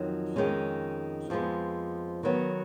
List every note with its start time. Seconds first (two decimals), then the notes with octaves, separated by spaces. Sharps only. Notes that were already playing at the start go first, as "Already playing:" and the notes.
Already playing: F2 D#3 F#3
0.36 F2 D#3 G#3 C#4
1.30 F2 F3 G#3 B3
2.23 D#3 F#3 B3